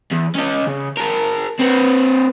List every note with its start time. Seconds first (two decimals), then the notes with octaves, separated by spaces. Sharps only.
0.12 E2
0.35 C#4 D#5
0.67 C#3
0.97 G#4 A#4
1.60 C4 B4